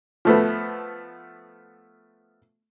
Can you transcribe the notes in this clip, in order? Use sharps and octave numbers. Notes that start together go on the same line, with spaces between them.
F3 A3 B3